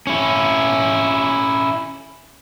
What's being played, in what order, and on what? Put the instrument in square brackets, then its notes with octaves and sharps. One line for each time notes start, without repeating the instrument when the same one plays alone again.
[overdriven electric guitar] C#4 E4